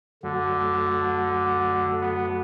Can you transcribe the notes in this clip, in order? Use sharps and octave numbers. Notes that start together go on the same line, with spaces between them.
F#2 D3 F#3 A3 F#4
B3